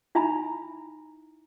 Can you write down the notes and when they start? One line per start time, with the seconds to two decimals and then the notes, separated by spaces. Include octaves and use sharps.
0.15 D#4 E4 E5 G#5 A#5 B5